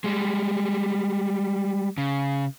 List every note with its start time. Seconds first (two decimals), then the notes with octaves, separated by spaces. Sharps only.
0.04 G3 G#3
1.98 C#3